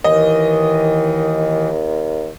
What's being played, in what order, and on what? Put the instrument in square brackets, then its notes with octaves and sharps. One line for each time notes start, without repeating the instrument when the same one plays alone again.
[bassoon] D#2 [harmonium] D#3 E3 [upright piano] D#5